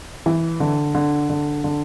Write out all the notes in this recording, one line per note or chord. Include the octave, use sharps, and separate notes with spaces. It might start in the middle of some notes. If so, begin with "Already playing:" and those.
E3
D3
D3
D3
D3